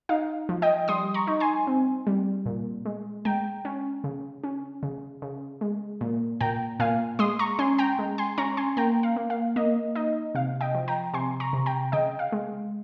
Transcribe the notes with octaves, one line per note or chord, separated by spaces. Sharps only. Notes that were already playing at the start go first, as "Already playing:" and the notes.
D#4 F5
F3
D#5 G5
G3 C6 D#6
A#5 C#6
D#4
G#5 C6
C4
G3
A#2
G#3
G#3 G5 A#5
C#4
C#3
C#4
C#3
C#3
G#3
A#2
A#2 G5 A#5
A#2 F5 G#5
G#3 C6 D#6
A#5 C#6
C#4 G#5 C6
G5 A#5
G#3
G#5 C6
C#4 A#5 C#6
G#5 C6
A#3 G5 A#5
F5
A#3
F5
A#3 D#5
D#4 D#5
C3 F5
D#5 G5
F3
G5 A#5
C3 G#5 C6
A#5 C#6
C3
G5 A#5
C#3 D#5 G5
F5
G#3